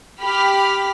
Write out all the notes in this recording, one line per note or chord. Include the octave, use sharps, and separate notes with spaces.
G4 B5 F6 B6